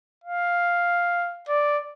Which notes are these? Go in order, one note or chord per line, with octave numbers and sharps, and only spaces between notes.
F5
D5